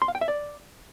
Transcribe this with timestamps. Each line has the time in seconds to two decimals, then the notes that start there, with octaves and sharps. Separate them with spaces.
0.02 C6
0.08 F5
0.15 G5
0.21 E5
0.28 D5